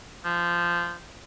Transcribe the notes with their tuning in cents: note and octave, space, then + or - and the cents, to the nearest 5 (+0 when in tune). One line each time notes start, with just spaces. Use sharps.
F3 -15